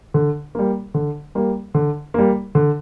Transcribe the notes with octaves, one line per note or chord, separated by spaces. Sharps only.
D3
G3 A#3
D3
G3 A#3
D3
G3 A#3
D3